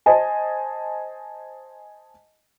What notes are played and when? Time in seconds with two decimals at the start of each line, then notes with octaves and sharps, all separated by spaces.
0.06 C5 D#5 G#5 A5